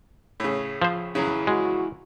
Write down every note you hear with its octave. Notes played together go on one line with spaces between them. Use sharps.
A2 C#3
F3 C5
C#3 F#3 E4 G#4
G#3 F#4